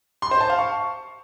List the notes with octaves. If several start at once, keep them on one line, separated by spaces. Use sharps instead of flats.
C6
C5
A5
F5
C#6